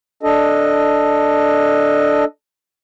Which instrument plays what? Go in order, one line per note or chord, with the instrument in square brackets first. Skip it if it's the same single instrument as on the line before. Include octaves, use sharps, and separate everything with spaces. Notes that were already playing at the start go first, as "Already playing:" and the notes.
[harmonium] D4 A4 D#5